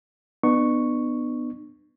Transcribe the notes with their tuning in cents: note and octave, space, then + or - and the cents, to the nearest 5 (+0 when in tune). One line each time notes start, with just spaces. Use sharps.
B3 +0 D4 +45 C#6 +0